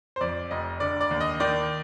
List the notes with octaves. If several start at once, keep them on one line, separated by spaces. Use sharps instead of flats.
C5
F2 D5
F1 D#5
D3 D5
D5
D#2
D#5
D#3 D5